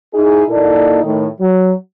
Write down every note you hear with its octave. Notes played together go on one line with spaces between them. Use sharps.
D#4 E4 G#4
A#2 A#3 D#4 E4 A4 D5
A2 D#3
F#3